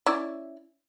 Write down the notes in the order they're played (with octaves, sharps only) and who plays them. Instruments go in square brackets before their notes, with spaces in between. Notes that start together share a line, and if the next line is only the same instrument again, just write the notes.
[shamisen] C#4 E4 D5